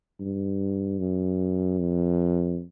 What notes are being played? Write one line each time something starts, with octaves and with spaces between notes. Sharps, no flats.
G2
F#2
F2